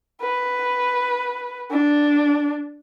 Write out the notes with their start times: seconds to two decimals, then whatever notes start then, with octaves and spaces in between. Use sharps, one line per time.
0.21 B4
1.71 D4